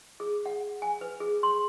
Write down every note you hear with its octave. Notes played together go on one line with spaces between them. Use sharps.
G#4
F#5
G#5
B4
G#4
C6